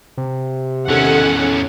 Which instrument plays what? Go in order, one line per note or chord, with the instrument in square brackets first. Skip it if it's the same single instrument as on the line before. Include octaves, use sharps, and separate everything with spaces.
[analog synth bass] C3
[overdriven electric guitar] E2 C#4 [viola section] D#3 A4 F#5